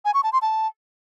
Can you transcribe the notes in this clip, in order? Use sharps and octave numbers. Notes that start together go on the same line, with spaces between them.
G#5
C#6
A5
C6
A5